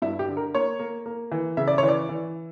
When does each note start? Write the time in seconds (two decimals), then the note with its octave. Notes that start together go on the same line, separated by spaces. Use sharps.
0.02 G2 E4
0.19 G4
0.28 D3
0.37 A#4
0.54 A#3 C#5
0.79 A#3
1.06 A#3
1.32 E3
1.57 C#3 E5
1.67 D5
1.78 E3 C#5
1.88 D5
2.09 E3